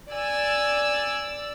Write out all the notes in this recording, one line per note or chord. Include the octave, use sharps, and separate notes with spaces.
D5 G#5 E6